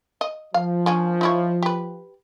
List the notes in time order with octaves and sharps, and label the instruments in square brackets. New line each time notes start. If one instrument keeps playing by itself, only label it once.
[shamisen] D#5
[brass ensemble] F3 [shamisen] F5
[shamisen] A#3 C#4 D4
D#4 E4 C#5
G4 B4